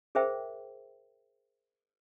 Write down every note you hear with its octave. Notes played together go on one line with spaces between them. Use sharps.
G#4 A#4 C5 E5 G5